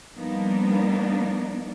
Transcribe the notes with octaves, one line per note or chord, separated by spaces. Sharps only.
F3 G3 A#3 B3 D4 D#4